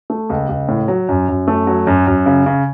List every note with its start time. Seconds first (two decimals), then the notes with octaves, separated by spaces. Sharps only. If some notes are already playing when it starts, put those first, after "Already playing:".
0.10 A3
0.30 C#2
0.49 C#2
0.68 A2
0.88 F#3
1.09 F#2
1.28 F#2
1.48 A3
1.67 F#3
1.87 F#2
2.07 F#2
2.26 C#3
2.46 C#3